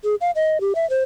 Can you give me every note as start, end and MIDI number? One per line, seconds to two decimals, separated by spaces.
0.04 0.15 68
0.21 0.31 77
0.36 0.61 75
0.61 0.73 67
0.75 0.88 76
0.90 1.03 72